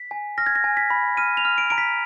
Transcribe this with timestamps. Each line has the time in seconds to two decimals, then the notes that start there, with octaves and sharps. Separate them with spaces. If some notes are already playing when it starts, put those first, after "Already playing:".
Already playing: B6
0.11 G#5
0.38 F6 A#6
0.46 G#6
0.55 A#6
0.64 G#5
0.77 B6
0.90 B5
1.17 F6 D#7
1.37 F7
1.45 F6
1.58 D7
1.70 A#5 D7
1.78 B6